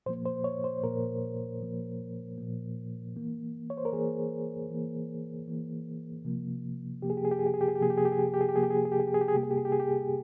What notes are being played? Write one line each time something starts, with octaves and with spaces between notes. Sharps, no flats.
A#2 F3 A#3 C5
C5
C#5
C5
A#2 F3 A#3 A#4
A#2 F3 A#3
A#2 F3 A#3
E3 A#3
C#5
C5
A#4
E3 A#3 G#4
E3 A#3
E3 A#3
C3 F3 A#3
C3 F3 A#3 G4
G#4
G4
G#4
G4
G#4
G4
G#4
G4
G#4
G4
C3 F3 A#3 G#4
G4
G#4
G4
G#4
G4
G#4
G4
G#4
G4
C3 F3 A#3 G#4
G4
G#4
G4
G#4
G4
G#4
G4
G#4
G4
G#4
C3 G3 A#3 G4
G#4
G4
G#4
G4
G#4
G4